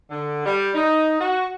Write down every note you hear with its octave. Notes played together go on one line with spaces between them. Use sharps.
D3
G3
D#4
F#4